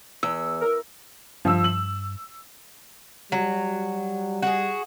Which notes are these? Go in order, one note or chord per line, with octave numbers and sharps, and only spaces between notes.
E2 E6
A#4
G2 F3 E6
F#7
F#3 G3
F#4 G#4